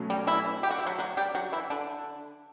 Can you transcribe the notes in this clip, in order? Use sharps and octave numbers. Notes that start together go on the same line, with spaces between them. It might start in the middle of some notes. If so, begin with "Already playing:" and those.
Already playing: B2 F#3 A3 C#4
G3
E3 E4
G4
F#4
E4
F#3 F#4
F#3 F#4
G3 G4
F#3 F#4
E3 E4
D3 D4